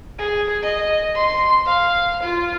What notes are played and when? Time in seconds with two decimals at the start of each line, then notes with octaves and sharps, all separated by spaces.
0.19 G#4
0.62 D#5
1.14 C6
1.65 F5
2.22 F4